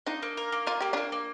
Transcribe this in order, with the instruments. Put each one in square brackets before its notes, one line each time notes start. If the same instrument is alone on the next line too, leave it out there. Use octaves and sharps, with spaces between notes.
[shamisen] D4 F4 [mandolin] D#4
[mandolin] A#3
A#4
A#3
[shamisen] F4 [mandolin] A#4
[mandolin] A#3 [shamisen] G4
[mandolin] A#3 [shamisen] D4 F4
[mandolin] A#3